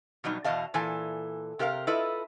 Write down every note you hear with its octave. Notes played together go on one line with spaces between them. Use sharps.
B2 F#3 G3 D#4
E2 B2 D#5 F5 A5
A#2 E3 A4 G#5 A5
C3 G4 A#4 C5 F5
E4 F4 A4 B4 D#5